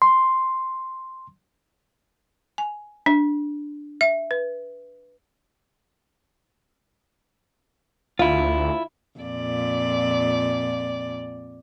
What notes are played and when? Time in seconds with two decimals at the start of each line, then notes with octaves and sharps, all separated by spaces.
0.02 C6
2.58 G#5
3.06 D4
4.01 E5
4.31 B4
8.19 D2 E4 F4
9.19 F2 A#2 D5